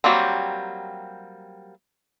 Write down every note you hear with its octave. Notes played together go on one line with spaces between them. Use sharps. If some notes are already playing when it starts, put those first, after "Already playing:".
F#3 G3 A#3 C4